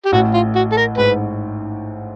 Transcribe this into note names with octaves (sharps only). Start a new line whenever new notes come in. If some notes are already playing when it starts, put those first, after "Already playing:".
G4
A1 A2 F#4
F4
F#4
A4
A#4
G#2 B4